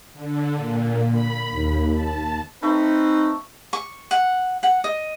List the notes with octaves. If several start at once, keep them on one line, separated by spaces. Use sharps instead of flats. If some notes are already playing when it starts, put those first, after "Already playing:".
D3
A#2
B5
D#2
A5
A3 C4 D#4 B4
C#6
F#5
F#5
D#5